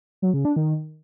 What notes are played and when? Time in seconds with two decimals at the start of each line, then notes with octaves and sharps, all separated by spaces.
0.22 F#3
0.34 C#3
0.45 D4
0.56 D#3